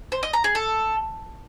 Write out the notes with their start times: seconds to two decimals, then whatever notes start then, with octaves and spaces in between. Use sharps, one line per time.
0.12 C5
0.23 D#5
0.33 A#5
0.44 G#4
0.55 A4